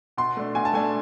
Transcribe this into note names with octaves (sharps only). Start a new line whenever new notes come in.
B2 C6
A3 D4
B2 G#5
A5
A3 D4 G#5